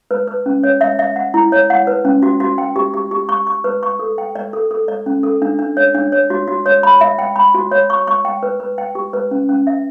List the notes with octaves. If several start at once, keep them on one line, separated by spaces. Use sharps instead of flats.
B4
B4
C#4
C#5
E5
E5
F#5
E4
C#5
F#5
B4
C#4
F#4
F#4
G5
G4
G4
G4
C#6
C#6
B4
C#6
A4
G5
D5
A4
A4
D5
C#4
A4
D4
D4
C#5
D4
C#5
F#4
F#4
C#5
B5
E5
G5
B5
F#4
C#5
C#6
C#6
G5
B4
B4
G5
G4
B4
C#4
C#4
E5